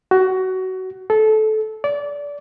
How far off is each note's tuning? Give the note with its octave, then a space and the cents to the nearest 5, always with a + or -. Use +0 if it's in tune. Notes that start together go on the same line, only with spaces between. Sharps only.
F#4 +20
A4 -20
D5 -25